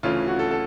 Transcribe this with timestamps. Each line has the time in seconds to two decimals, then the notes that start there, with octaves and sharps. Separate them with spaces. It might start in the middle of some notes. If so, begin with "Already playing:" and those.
0.03 D2 C#3 E3 A3 C#4 F4
0.28 F#4
0.39 A4
0.51 A4